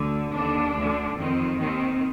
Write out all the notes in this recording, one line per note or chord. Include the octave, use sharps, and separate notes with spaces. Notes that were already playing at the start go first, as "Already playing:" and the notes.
Already playing: D2 D3
D#2 D3 D4
D2 D3
F2 D#3 C4
D#2 D#3 C4